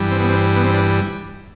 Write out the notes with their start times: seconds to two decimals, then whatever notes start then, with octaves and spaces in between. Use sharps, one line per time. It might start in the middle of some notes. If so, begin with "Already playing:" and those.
Already playing: G2 E3 G3
0.11 C4
0.20 B3
0.29 C4
0.56 B3
0.64 C4
0.74 D4